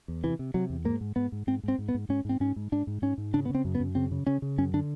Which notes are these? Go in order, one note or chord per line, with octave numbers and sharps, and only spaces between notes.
E2
C3 E3
C3
C3 F#3
E2
G#2 A#3
G#2
G#2 B3
G#2
G#2 C4
G#2 C4
G#2
B3
G#2
G#2 C#4
G#2 C4
G#2 C#4
G#2
G#2 D4
G#2
G#2 C#4
G#2
C#3 D4
B3
C#3
C4
F#2
B3
F#2
C#3 C4
C#3
C#3 C#4
C#3
F#2 C#4
D3 D4